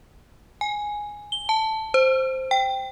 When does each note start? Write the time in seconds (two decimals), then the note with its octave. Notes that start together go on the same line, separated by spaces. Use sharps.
0.61 G#5
1.32 G7
1.49 A5
1.94 C5
2.51 G5